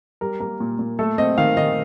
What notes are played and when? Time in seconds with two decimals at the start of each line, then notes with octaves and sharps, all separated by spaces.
0.21 G3 A#4
0.40 A#3 A#4
0.60 A#2
0.79 A#2
0.99 A3 A4
1.18 C4 D#5
1.38 D#3 F5
1.57 D#3 D#5